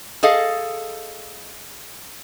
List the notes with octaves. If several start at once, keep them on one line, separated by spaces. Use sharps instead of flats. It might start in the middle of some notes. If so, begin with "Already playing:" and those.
G#4 A4 D#5 F5